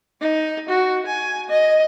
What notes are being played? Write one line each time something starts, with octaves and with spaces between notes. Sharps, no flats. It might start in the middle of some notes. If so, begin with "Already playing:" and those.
D#4
F#4
G#5
D#5